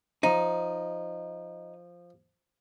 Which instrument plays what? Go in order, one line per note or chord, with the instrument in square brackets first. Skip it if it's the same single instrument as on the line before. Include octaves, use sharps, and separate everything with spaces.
[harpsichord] F3 [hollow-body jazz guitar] D#4